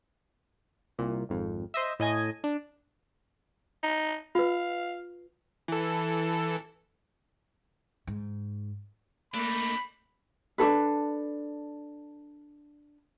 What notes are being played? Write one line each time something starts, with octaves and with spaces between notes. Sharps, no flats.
C2 A#2
G#1 F2
C5 D#5 E5
A2 D#5 G#5
D4
D#4
F4 B4 F5
E3 A4
G#2
A3 A#3 D4 D#4 B5
D4 D#4 A4 B4